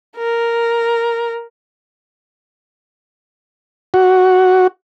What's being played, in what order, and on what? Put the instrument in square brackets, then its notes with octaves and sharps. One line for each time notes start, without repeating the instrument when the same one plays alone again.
[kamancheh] A#4
[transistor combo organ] F#4